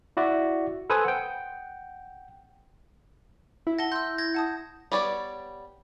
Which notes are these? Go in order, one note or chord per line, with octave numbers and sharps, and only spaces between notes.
E4 F#4 D5 E5
A4 B4 C5 G#5 D#6 E6
F#5 G5
E4
F#5 A5 A#6 G7
C6 E6 G6
G#6 A#6
F#5 A5 D#6
G3 B3 C#5 D5